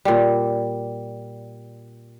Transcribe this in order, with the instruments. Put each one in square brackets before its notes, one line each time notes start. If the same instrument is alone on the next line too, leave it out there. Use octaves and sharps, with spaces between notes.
[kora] A#2 G3